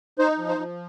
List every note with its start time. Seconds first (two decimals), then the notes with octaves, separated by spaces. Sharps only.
0.19 D#4 C5
0.39 F3
0.49 C5
0.58 F3